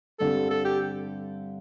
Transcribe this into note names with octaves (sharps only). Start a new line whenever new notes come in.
G2 D3 G3 C4 A4
A4
G4